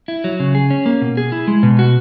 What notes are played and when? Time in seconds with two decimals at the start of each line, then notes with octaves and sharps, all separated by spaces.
0.08 E4
0.24 F#3
0.40 C#3
0.55 G#4
0.70 C#4
0.86 A#3
1.01 B2
1.17 G#4
1.32 E4
1.47 G#3
1.63 B2
1.79 F#4